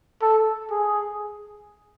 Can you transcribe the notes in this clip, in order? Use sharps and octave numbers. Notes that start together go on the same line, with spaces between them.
A4
G#4